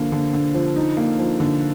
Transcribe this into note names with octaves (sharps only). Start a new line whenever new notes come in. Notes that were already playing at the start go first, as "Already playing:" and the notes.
Already playing: D3 F3 A#3
D3
D3
F3
D#4
A#3
F3
D3